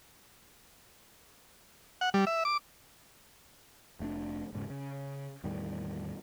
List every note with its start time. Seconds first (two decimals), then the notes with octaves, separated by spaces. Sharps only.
2.01 F#5
2.14 G3
2.27 E5
2.45 D6
4.00 F1 A3 C4 D4
4.53 E1 G#2 C#3
4.70 C#3
5.44 E2 A2 D#3 G3